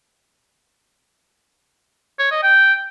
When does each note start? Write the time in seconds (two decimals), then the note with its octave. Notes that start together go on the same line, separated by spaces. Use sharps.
2.19 C#5
2.31 D#5
2.43 G5